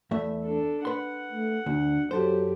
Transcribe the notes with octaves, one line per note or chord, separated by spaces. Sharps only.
E2 A3 E5
D4 A4
B4 F#5 C6
A3
D2 D4
F#2 F#3 G4 A4 C5